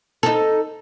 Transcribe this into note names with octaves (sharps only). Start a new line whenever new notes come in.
D#4 A4